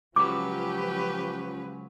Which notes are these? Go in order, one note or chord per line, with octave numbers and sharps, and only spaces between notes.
C#2 F3 F#3 C#4 G4 B4 D6